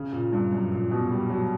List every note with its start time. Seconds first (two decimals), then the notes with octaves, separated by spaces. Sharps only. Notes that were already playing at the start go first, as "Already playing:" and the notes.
Already playing: C#3
0.13 A#2
0.33 G2
0.52 F#2
0.72 A#2
0.91 B2
1.11 G3
1.30 F#3